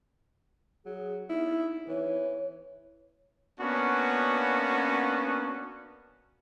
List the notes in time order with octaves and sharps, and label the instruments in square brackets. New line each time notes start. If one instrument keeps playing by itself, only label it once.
[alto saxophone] F#3 [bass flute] G#4
[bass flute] D#4 [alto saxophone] E4
[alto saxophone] E3 [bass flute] C#5
[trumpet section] A#3 B3 C#4 D4 F#4